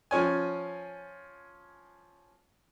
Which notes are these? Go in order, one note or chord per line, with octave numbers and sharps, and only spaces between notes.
F3 C#4 G#5